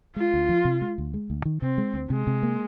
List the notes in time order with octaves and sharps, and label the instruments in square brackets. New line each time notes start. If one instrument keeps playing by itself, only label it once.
[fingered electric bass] G#3 [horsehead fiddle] F4
[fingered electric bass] D2
F3
C3
G#3
D2
G#3
D2
D#3
[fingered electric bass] C3 [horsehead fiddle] C4
[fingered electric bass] G#3
D2
[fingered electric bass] C3 [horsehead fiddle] G#3
[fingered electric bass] C3
A#3